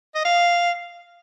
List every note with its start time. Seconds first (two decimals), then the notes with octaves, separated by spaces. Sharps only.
0.15 D#5
0.25 F5